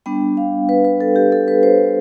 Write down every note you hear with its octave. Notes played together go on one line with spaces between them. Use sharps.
G3 B3 D4 G5
F5
B4
B4
A4
G4
A4
B4
C5